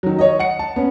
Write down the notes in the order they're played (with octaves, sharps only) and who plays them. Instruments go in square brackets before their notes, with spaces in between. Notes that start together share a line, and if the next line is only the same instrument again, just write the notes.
[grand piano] D#3 F#3
C#5 D#5
F#5 C#7
A5
B3 C#4